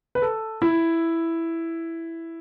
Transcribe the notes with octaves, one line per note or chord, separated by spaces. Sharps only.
B4
A4
E4